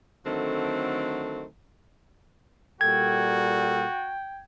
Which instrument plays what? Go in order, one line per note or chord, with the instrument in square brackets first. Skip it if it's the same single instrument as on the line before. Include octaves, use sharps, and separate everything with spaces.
[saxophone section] D3 D#3 F#3 A3 C4
[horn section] A#2 G3 A4 [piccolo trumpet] F#4 [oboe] G5 [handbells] G#6